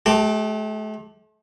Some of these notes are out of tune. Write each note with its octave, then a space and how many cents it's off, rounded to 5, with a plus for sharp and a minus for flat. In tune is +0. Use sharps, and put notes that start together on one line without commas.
A3 -40 G4 +0 A5 +0